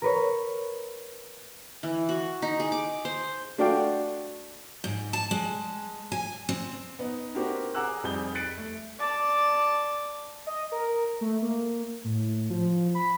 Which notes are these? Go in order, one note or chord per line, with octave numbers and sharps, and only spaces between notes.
A#4 B4 C#5
E3
F#4
D#4
G#4
D6
C5
A3 D4 F#4 D5 F5 G5
G#2
A5
G#3
G#5
C4
B3 D#4
A#3 C4 D4 F#4 G4 A#4
G#4 F#5 A#5 D6 E6 F#6
F2 G3 D#4 G#4 G6 G7
F#6 A6 B6 C#7 D7
A3
D5 A5
D#5
A#4
A3
A#3
A2
F3
B5